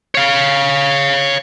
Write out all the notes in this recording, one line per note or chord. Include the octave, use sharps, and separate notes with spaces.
C#5 F5